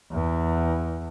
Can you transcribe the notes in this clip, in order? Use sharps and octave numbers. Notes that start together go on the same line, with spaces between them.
E2